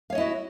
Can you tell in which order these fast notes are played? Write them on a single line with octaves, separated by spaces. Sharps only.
F5 C#5 D#5 E4 F#4